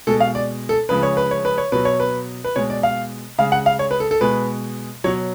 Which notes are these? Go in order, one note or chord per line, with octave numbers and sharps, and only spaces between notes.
B2 G#3 A4
F5
D5
A4
C#3 F3 G#3 B4
C#5
B4
C#5
B4
C#5
B2 F#3 B4
C#5
B4
B4
B2 G#3 C#5
D5
F5
C#3 G#3 F5
F#5
F5
C#5
B4
A4
A4
B2 G#3 B4
B2 F#3 C#5